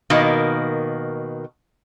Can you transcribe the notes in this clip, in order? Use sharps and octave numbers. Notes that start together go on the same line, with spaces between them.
B2 D#3 A#3